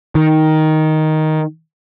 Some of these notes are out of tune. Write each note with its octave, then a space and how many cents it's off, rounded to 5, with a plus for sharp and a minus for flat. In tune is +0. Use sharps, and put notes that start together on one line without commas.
D#3 +5